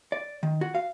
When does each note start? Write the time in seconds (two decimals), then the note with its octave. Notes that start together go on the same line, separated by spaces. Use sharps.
0.12 D5
0.43 D#3
0.61 F#4
0.75 F5